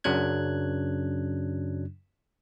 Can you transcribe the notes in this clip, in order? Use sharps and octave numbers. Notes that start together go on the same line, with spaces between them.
F#2 C#3 F#3 D4 F#6 G#6